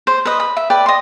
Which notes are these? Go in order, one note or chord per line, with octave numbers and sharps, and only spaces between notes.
C5
B4 D#5
B5
E5
B4 D5 G5
D#5 C6